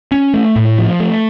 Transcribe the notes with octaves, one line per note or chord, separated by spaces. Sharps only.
C#4
A3
A2
F3
A3